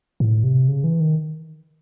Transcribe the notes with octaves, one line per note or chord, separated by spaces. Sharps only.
A2
C3
C#3
E3
D#3